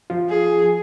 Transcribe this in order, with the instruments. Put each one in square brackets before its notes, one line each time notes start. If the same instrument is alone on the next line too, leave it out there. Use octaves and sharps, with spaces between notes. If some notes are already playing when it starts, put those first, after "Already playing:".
[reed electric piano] F3 F4
[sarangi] G#4